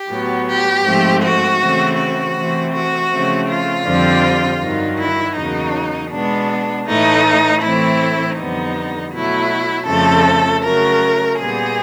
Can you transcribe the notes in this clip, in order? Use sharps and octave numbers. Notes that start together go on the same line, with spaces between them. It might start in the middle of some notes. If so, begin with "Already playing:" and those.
Already playing: G4
A2 F#3 B3
G4
G#2 F3 A3 C4
F#4
C#3 E3 A3 C4
F#4
C3 E3 A3 C4
F#4
C#3 F3 A3 C4
F4
F2 D3 G3 C4
G2 D#3 F#3
E4
E2 C#3 F#3 A#3 D#4
B2 G#3 B3 D4
A2 E3 A3 D#4
A2 E3 A3 C4 E4
F2 D3 G3 B3 D#4
B2 F#3 A3 E4
F2 C#3 F3 A3 A4
C#3 F#3 A3 A#4
A#2 G3 B3 G#4